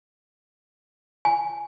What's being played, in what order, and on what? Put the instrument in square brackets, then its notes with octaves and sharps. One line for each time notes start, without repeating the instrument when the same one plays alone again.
[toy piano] G#5